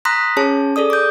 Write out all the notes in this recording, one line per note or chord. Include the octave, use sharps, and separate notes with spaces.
A#5 C6 D#6 F#6 A#6 B6
C#4 G#4 C#5 A5
G#4 A4 D5 D#6
D6 G6